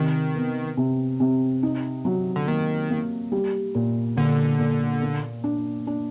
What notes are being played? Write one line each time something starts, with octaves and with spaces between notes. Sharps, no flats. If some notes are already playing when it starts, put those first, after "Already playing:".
Already playing: C3 D#3
B3
C3
C3
D#4
F#3
D3
D#3 A#3
A#3
G3
A#2
A#2 D3
A#2
A#3
D4
D4